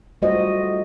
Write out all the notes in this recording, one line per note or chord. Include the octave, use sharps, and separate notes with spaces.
G3 A3 F4 F#4 C5 D#5